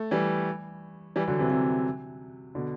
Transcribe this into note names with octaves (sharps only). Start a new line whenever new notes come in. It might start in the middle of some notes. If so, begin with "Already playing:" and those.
Already playing: A3
E3 G3
E3 G3
D3 F#3
C3 E3
C3 E3
B2 D3